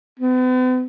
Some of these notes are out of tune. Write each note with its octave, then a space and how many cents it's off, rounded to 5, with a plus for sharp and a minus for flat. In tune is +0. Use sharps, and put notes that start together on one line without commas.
B3 +45